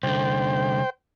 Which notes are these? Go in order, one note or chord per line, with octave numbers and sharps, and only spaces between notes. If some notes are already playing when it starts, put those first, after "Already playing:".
C2 D3 C5 G5